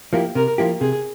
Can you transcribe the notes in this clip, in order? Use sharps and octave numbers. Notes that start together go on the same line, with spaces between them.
F3 A#3 E4 G4
C3 A#4
F3 A#3 E4 G4
C3 G#4